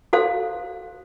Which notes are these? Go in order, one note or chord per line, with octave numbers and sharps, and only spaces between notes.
F#4 A4 C5 F5